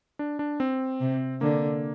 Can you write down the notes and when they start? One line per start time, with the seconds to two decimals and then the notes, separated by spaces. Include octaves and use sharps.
0.19 D4
0.39 D4
0.60 C4
1.01 C3
1.41 D3 A#3